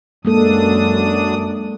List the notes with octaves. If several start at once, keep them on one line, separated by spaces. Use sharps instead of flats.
F#2 G#3 A#3 D4 A4 D#6